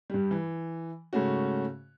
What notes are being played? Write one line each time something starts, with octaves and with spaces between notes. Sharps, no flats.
G2 G3
E3
G#2 C#3 A3 C#4 F#4